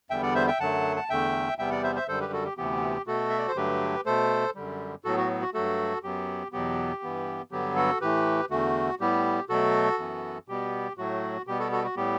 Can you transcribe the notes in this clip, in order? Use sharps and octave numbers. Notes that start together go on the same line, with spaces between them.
E2 D3 G3 B3 E5 G5
D5 F#5
C5 E5
E5 G5
F#2 D3 F#3 A3 F#5 A5
A5
E2 D3 A3 E5 G5
E2 C3 G3 B3 E5 G5
D5 F#5
C5 E5
C5 E5
F#2 D3 G3 A4 C5
G4 B4
F#4 A4
G4
D2 C3 E3 B3 G4
B2 A3 F#4 A4
E5
D5
C5
G2 D3 F#3 A3 G4 B4
B2 A3 A4 C5
F#2 D3 G3
A2 F#3 B3 F#4 A4
F#4
F#4
G2 F#3 A3 F#4 A4
F#2 F#3 B3 G4
E2 B2 F#3 B3 G4
G2 E3 B3
G2 D3 F#3 B3 G4
F#4 A4
A2 E3 A3 G4 B4
E2 D3 A3 F#4
A2 G3 B3 G4
B2 F#3 A3 F#4 A4
F#2 E3 B3
B2 G3 B3 G4
A2 F#3 A3 F#4
B2 G3 B3 G4
F#4 A4
F#4 A4
F#4
A2 G3 B3 G4